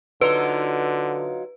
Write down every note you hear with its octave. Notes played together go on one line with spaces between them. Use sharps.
D3 F#3 D#4 F4 B4